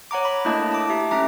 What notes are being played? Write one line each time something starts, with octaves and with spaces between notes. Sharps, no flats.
C#5 F#5 A#5 D6
B5
A3 A#3 D4 E4 D#5 A5
A5 D6
G4 E5 A#5
A3 C#4 E4 E5 A#5 D6